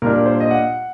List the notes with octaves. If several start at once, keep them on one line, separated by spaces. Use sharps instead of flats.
A#2 G3 D4 A#4
C5
D#5
F#5